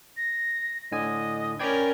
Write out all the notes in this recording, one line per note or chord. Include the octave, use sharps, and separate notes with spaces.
A#6
A2 D3 D#5 G#5
C#4 A#4 D5 G5 B5 G#6